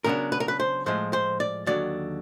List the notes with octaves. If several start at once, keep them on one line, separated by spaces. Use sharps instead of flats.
C#3 F#3 B3 D4 A#4
B4
A#4
B4
C5
A2 F3 G#3 C5
C5
D5
D#2 D3 F#3 D5